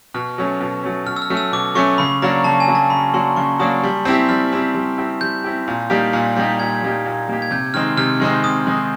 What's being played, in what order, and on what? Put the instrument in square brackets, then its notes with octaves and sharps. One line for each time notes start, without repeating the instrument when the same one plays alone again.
[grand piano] B2 [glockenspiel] F6
[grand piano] F#3 A3 C#4
B2
F#3 A3 C#4
[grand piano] B2 [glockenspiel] F6
[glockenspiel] E6
F6
[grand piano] F#3 A3 C#4
[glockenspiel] E6
[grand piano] B2 [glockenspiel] D6
[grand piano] F#3 A3 C#4 [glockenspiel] C#6
[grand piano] C#3 [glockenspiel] B5
[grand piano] F#3 A#3 D4 F#4 [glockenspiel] A#5
[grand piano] C#3 [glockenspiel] A5
[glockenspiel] G#5
[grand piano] F#3 A#3 D4 F#4
[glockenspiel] A5
[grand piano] C#3 [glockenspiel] B5
[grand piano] F#3 A#3 D4 F#4 [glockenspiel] C6
[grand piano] C#3 [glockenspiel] C#6
[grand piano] F#3 A#3 D4 F#4 [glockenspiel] D#6
[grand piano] G3
C4 E4 G4
[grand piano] G3 [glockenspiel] F6
[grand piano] C4 E4 G4
G3
C4 E4 G4
[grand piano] G3 [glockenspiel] G6
[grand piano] C4 E4 G4
A#2
G3 A#3 D#4 G4
A#2
G3 A#3 D#4 G4
[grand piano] A#2 [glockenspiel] G#6
[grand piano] G3 A#3 D#4 G4
A#2
G3 A#3 D#4 G4
[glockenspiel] G#6
[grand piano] C3 [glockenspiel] G6
[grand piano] D#3 G#3 C4 D#4 [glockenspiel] F6
[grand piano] C3 [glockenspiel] F6
[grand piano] D#3 G#3 C4 D#4
[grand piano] C3 [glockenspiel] D#6
[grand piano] D#3 G#3 C4 D#4